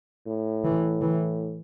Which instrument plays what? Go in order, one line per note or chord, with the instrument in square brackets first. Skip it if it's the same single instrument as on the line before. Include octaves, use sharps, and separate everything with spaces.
[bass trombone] A2
[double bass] E3
E3